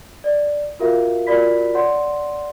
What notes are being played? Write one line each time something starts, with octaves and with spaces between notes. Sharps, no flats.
D5
F4 F#4 A#4 E5 F5
F4 F#4 A#4 D5 B5 B6
C#5 D5 F#5 C6